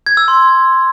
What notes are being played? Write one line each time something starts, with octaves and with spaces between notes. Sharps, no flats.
G#6
E6
C6